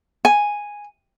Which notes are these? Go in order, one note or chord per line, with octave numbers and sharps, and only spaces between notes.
G#5